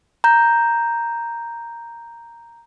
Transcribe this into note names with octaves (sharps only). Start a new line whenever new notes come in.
A#5 G6